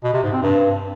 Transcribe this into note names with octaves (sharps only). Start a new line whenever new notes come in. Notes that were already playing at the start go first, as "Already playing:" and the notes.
B2
C3
G#2
C4
G2